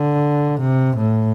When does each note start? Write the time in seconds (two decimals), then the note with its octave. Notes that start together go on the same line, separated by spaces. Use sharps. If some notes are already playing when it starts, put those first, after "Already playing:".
Already playing: D3
0.60 C3
0.97 A2